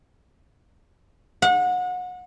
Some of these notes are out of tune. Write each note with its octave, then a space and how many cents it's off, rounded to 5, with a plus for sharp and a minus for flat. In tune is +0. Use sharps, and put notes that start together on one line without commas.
F#5 -30